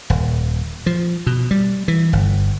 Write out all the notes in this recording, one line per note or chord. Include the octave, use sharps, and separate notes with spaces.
D#1
F3
B2
G3
E3
G1